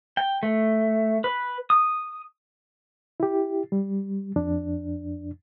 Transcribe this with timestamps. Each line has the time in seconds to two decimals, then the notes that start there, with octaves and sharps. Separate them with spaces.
0.17 G5
0.43 A3
1.24 B4
1.70 D#6
3.20 E4 G4
3.72 G3
4.36 F2 D4